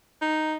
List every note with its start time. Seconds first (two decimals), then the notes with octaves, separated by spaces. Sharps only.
0.21 D#4